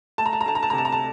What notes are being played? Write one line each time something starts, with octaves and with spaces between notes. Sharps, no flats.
A3 A5
A#5
A5
A#5
D2 A5
A#5
A5
A#5
C3 A5
A#5
A5